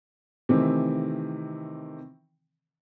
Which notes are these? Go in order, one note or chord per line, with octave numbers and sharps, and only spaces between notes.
C3 D#3 E3 A3 C4